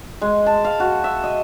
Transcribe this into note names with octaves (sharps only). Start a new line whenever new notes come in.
G#3
A5
F5
F#4
E5
D#5